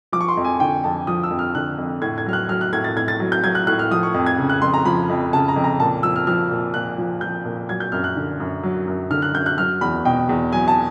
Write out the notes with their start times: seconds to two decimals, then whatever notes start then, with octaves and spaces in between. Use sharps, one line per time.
0.12 F3 D6
0.21 C#6
0.28 C6
0.37 F2
0.44 G#5
0.60 D3 G5
0.84 F2 A5
1.07 F3 D#6
1.23 E6
1.31 F2
1.39 F6
1.55 D3 F#6
1.78 F2
2.02 A2 G#6
2.18 G#6
2.26 F#3 F6
2.33 F#6
2.49 F#3 F6
2.61 F#6
2.73 A2 G#6
2.84 A6
2.96 A2 G#6
3.08 A6
3.20 F#3
3.32 G6
3.44 F#3 G#6
3.55 F#6
3.67 A2 F#6
3.79 F6
3.91 F3 D#6
4.03 C#6
4.14 F2
4.26 G#6
4.38 C#3
4.50 F#6
4.62 F2 C6
4.74 A#5
4.85 F3 B5
5.09 F2
5.33 C#3 A5
5.48 A#5
5.56 F2
5.64 A#5
5.80 A#2 A5
6.03 F3 E6
6.16 F6
6.27 F3 F6
6.51 A#2
6.74 A#2 F#6
6.98 F3
7.21 F3 G6
7.45 A#2
7.69 F#3 G#6
7.80 G6
7.92 F#2 F6
8.04 F#6
8.16 D3
8.40 F#2
8.63 F#3
8.88 F#2
9.10 D3 F6
9.22 F#6
9.34 F#2 G6
9.46 F#6
9.58 F#3 F6
9.81 E2 B5
10.05 B2 G5
10.29 E2
10.52 F#3 G#5
10.68 A5